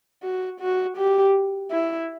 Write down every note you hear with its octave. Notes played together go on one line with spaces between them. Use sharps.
F#4
F#4
G4
E4